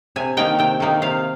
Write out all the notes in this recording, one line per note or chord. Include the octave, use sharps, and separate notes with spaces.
C3 G#5
D#3 A#3 D#4 G5
C3 G5
D#3 A#3 D#4
C3 F5